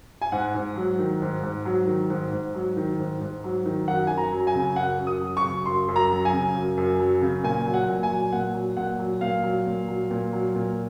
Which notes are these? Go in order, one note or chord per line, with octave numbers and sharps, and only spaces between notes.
G#5
G#2 F#5
G#2
F#3
D#3
G#2
G#2
F#3
D#3
G#2
G#2
F#3
D#3
G#2
G#2
F#3
D#3
F#2 F#5
F#2 G#5
A#5
F#3
G#5
C#3
F#2 F#5
F#2
D#6
F#3
C#6
C#3
F#2 C6
F#2
A#5
F#3
G#5
C#3
F#2
F#2
F#3
C#3
A#2 G#5
F#3
F#5
A#2
G#5
F#3
A#2 F#5
F#3
A#2 F#5
F#3
A#2 F5
F#3
A#2
F#3
A#2
F#3
A#2